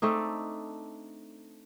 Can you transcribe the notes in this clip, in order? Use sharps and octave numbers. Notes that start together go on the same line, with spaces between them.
A3 C4 D4 D#4